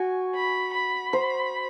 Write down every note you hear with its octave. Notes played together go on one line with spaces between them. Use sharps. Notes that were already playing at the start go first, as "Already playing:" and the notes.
Already playing: F#4 G#5
B5
B5
C5